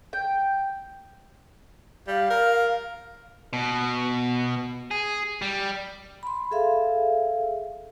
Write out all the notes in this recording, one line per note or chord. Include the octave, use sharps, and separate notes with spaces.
G5
G3 F5
A#4
B2
G#4
G3
B5 C6
G#4 A4 E5 F5